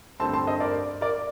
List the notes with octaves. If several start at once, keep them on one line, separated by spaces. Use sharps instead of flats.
G2 D3 A3 C4 A5 C6
A5 C6
C5 D#5
A#4 D5
A#4 D5